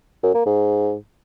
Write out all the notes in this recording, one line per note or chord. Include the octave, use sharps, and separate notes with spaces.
F#2
A#3
G#2